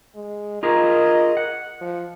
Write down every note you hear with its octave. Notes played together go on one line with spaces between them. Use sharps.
G#3
F4 G#4 A#4 D#5
F#5
F3